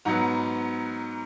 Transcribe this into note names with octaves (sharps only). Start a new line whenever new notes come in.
G#2 F#3 B3 F#5 A#5